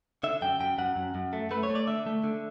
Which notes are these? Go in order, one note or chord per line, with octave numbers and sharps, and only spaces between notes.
D3 E5
F#2 G5
F#2 G5
F#2 F#5
F#2
F#2
A3
A3 B4
C#5
A3
D5
D3 E5
A3
D3